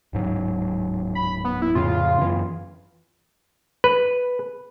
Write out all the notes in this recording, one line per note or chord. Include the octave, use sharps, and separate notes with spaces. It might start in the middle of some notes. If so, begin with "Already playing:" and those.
D1 G#2 F#3
B5
B3
E4
F2 A2 C#3 F4
F#2 E3
B4